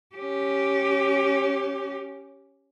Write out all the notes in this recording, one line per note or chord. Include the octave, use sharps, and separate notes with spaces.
C#4 G4